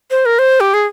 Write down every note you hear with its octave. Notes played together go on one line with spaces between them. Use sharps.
C5
A#4
C5
G4
G#4